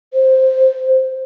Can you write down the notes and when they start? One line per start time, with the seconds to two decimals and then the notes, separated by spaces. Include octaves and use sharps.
0.14 C5